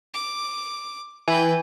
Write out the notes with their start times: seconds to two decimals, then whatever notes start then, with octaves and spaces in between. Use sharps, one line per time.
0.14 D6
1.28 E3 B4 G5 G#5